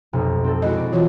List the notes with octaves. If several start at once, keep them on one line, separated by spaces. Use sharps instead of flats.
F1 B1
C4 A4
G#3 E4 F#4 D#5
D5
E3 F4 C#5